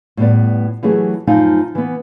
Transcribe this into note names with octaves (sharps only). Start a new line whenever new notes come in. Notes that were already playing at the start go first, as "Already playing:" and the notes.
A2 G3 B3 D5
E3 F#3 A3 E4 G4 G#4
F#2 F3 A3 D#4 F5 G#5
E3 B3